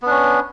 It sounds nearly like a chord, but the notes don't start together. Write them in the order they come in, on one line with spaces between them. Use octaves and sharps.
B3 D4 C#4